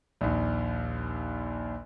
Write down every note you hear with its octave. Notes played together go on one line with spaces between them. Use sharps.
A#1 D#2